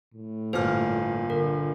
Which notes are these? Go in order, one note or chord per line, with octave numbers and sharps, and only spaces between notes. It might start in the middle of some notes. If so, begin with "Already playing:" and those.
A2
G1 A#2 C5 F6
D3 A#4